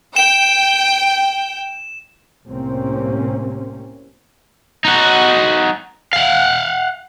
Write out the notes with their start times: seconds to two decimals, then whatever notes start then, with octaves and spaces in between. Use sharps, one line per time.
0.16 G5 E7
2.47 C2 A2 C3 A#3 C4 C#4
4.85 D#4 F#4
6.13 F5 F#5